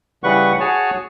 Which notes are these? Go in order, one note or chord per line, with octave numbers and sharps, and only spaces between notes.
C#3 E3 G3 B4 F#5 C#6
F#4 G#4 C#5 G#5 A5